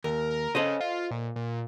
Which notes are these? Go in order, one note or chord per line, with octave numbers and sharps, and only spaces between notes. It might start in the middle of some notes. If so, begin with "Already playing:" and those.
D#2 A#4
C#3 A4 C5 D#5
F4
A#2
A#2